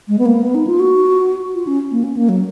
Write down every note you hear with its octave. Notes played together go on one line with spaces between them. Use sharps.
G#3
B3
A#3
B3
D#4
F4
F#4
F4
C#4
A#3
C#4
A#3
F#3